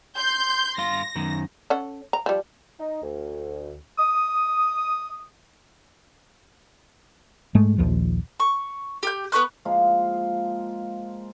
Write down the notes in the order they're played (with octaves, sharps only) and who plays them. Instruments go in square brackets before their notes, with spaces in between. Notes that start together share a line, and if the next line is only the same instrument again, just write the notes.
[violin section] C6 G6
[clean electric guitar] G2 F5 C6 [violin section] A#6
[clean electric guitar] F#2 D#3
[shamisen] C#4 A4 F#5
A#5
F3 G3
[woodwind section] D#4
D2
D#6
[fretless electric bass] G#2 G#3 A3
A#1 D#2 F3
[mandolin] C#6
G4 G6
B3 B4 C#6 F#6
[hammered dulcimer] F3 G#3 A#3 F4